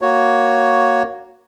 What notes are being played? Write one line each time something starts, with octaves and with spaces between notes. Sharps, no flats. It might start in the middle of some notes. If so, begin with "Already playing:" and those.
A#3 F#4 C#5